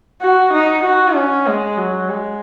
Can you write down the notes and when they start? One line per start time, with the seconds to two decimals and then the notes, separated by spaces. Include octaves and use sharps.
0.21 F#4
0.53 D#4
0.84 F#4
1.15 C#4
1.47 G#3
1.77 F#3
2.09 G#3